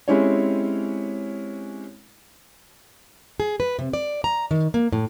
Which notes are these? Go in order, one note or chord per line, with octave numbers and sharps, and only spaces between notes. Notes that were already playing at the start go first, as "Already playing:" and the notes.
G#3 C4 C#4 E4 G4 C#5
G#4
B4
C3
D5
A#5
D#3
A#3
A2